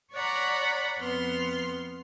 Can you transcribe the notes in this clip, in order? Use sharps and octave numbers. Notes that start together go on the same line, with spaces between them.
C#5 D5 F#5 A#5 B5
F2 B3 C6 F6